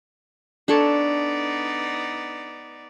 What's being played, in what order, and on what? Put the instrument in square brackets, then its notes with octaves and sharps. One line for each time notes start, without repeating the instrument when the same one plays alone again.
[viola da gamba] B3 D#4 D5 [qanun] D4 A4 C#5